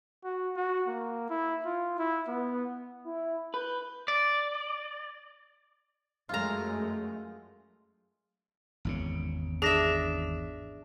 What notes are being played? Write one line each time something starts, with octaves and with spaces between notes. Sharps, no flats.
F#4
F#4
A#3
E4
F4
E4
B3
E4
B4 G6
D5
F#2 G#3 A3 F4 A#5
G#1 E2 C#3
D4 G#4 E5 A#6